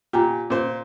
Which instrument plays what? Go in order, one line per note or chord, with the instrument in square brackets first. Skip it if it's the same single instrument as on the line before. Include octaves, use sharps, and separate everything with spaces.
[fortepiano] A#2 G4 [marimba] F4 G#5 A#5
[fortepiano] A#2 C5